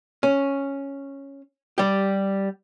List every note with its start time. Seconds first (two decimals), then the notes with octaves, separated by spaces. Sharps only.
0.23 C#4
1.78 G3 G4